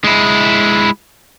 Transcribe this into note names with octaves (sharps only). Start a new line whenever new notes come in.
G#3 E4